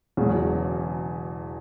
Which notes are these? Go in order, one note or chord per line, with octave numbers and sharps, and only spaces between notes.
E1 E2 C#3 F#3